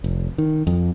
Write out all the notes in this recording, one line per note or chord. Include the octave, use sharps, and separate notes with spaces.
F1
D#3
F2